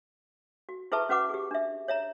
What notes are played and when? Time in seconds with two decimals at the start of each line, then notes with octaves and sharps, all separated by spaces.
0.69 F#4
0.92 E4 G#4 B4 E5 A5 C#6
1.09 C#4 F#4 B4 F#5 D6
1.30 G4 G#4
1.51 D4 E5
1.88 C#5 E5 A#5